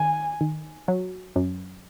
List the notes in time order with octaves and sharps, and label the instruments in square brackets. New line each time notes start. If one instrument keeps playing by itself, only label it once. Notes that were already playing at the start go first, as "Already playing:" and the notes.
Already playing: [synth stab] D#3 [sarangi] G#5
[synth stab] D#3
F#3
F#2